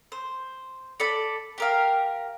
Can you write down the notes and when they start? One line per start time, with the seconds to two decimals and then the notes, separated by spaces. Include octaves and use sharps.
0.12 C5
1.00 A4 D5 B5
1.58 G4 A#4 F5